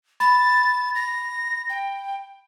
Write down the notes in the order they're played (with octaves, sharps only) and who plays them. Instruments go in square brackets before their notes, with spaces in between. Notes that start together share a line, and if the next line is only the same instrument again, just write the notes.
[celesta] B5 [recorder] A6
[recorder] A#6
G5